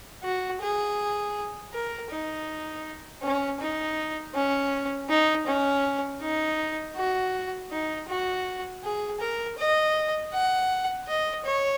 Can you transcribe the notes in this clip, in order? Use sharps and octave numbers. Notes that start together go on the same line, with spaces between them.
F#4
G#4
A#4
D#4
C#4
D#4
C#4
D#4
C#4
D#4
F#4
D#4
F#4
G#4
A#4
D#5
F#5
D#5
C#5